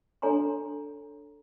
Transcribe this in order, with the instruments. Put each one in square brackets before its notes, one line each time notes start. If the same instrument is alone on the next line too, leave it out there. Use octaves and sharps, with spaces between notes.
[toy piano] D4 A4 C#5 G#5 A#5 C6